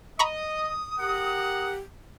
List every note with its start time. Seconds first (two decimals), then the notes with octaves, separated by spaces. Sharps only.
0.19 D#5 A#5 B5 C#6 D#6
0.99 G4 A#4 F#5